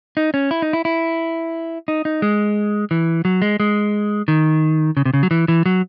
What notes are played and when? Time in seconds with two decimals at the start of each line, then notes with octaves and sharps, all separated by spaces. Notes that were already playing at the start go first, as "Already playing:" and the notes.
0.17 D#4
0.34 C#4
0.51 E4
0.62 D#4
0.73 E4
0.85 E4
1.88 D#4
2.05 D#4
2.22 G#3
2.91 E3
3.25 F#3
3.42 G#3
3.60 G#3
4.28 D#3
4.97 C#3
5.05 C3
5.14 C#3
5.23 F#3
5.31 E3
5.48 E3
5.66 F#3